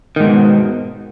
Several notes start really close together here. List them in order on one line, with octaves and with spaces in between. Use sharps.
D#3 G#2 B2